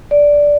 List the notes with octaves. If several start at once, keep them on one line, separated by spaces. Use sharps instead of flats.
D5